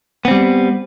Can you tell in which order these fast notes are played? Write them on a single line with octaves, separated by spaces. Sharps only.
B3 C4 G3